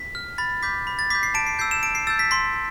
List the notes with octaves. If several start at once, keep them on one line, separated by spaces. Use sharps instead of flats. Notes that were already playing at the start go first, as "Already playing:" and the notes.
Already playing: B6
F6
B5 A6
D6 G6 B6
B5
A6
D6 G6 B6
C7
A5 D7
C7
E6 G6 C7
E7
A5 D7
C7
E6 G6 A6
B6
C6 B6